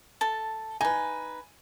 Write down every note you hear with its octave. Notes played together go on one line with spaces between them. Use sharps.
A4 A5
D#4 B4 G#5